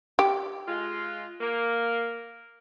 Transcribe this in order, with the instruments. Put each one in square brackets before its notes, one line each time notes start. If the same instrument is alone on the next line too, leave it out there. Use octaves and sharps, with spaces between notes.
[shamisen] G4
[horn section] G#3 F4
A#3